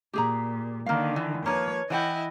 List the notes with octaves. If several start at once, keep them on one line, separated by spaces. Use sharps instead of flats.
A#2 G4 G#4 A#5
D3 D#3 A#3 F5
E3
F3 A#3 B4 C#5
E3 E4 D#5 F#5 G5